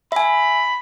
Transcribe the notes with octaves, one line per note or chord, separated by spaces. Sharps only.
E5 G#5 B5